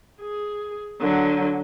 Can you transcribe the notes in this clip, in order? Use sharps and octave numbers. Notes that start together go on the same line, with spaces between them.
G#4
D3 F#3